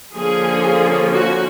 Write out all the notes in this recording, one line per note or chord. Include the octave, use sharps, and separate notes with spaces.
D3 F3 A#3 C#4 G#4
F#4